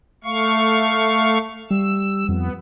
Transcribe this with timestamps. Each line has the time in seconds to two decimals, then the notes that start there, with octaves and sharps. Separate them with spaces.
0.24 A3 F5 C#6
1.71 G3 E6
2.29 F2 B3